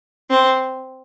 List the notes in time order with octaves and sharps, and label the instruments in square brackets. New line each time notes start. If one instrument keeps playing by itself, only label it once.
[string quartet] C4